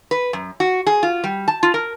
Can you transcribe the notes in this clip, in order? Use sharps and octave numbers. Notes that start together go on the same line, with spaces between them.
B4
F#2
F#4
G#4
F4
G3
A5
F4
A#4